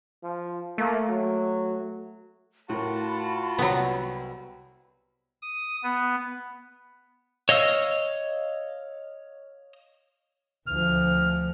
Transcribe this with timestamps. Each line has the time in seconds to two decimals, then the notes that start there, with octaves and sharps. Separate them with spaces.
0.23 F3
0.78 A3 A#3
1.09 F#3
2.69 A2 F4 F#4 A#4 A5 B5
3.58 C2 F#3 B3
5.42 D#6
5.83 B3
7.49 C#5 D#5 F5 E6
10.67 D2 F3 F6